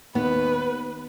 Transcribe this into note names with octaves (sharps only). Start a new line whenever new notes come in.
D#2 B3 B4